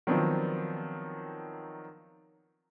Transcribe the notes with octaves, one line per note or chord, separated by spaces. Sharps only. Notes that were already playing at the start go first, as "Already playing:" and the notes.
D#3 F3 F#3 B3 C4 D4